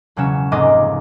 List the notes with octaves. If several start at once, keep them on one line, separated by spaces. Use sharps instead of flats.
E1 C#3 F#3 C#4 E7
F1 G#2 A#3 D#5 D6